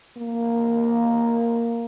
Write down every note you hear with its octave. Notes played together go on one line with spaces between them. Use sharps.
A#3